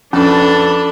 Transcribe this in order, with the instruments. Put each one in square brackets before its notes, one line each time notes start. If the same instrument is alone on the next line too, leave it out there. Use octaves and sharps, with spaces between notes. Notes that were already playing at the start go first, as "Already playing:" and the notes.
[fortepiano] F2 [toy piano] C#4 [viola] D4 [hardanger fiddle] A4 B4